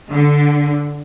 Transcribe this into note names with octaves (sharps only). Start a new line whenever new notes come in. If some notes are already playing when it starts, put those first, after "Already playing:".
D3